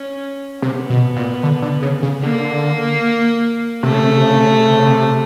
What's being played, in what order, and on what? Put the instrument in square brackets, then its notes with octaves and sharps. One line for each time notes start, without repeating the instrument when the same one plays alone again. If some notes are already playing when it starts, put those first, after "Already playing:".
Already playing: [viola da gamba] C#4
[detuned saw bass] C3 [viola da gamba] B3
[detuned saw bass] B2
A#2
D3
D3
C#3
C#3
[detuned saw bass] D3 [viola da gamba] A#3
[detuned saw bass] C3 [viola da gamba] A3
[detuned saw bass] C#3
C3
C#3
C3
C#3
C3
C#3
C3
C#3
C3
C#3
C3